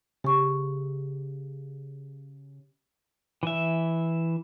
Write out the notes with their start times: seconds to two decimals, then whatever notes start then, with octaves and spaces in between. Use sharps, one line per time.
0.24 C#3 G4 C#6
3.43 E3 E5